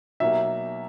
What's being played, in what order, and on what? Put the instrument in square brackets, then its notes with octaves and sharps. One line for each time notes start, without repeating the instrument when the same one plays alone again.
[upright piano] B2 F#3 A#3 D#4 G4 [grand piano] E5